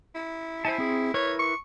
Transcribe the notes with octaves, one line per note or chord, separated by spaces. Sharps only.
E4
E4 C5 G#5 A5
C4 G#4
E4 A#4 B4 C#5
C#6